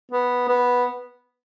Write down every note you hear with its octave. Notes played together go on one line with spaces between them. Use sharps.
B3
B3